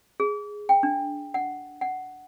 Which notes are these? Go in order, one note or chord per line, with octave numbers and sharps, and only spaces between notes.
G#4
G5
D4
F#5
F#5